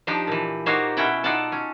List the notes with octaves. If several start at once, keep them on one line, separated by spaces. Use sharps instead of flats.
F3 D4 D#4 G4
A#2 E3
A#3 D#4 F#4 G4 C5 C#5
B2 C#4 E4 F#5 G5
D#4 F4 A4 D5 F#5 A5
C#4